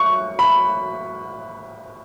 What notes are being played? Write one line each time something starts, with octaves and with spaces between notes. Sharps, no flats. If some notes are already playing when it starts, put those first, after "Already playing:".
Already playing: C#6
B5